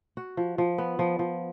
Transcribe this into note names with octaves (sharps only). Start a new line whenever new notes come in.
F#4
F3
F3
B3
F3
F3